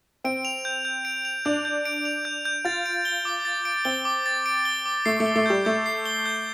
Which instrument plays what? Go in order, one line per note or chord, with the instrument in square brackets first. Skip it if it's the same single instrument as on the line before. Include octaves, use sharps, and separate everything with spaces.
[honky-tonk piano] C4 [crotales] D7
[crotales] F7
G6
G6
D7
F7
[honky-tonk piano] D4 [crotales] G6
[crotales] G6
D7
F7
G6
G6
[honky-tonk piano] F4 [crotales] A6
[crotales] D7
G7
D6
A6
D7
[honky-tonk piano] C4 [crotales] G7
[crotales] D6
A6
D7
G7
D6
[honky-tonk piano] A3 [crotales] C7
[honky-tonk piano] A3
[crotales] G7
[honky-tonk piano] A3
[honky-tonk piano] G3 [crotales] G6
[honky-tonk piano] A3 [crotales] G6
[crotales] C7
G7
G6